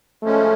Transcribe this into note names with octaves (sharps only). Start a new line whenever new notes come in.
A2 F3 G#3 A3 C#4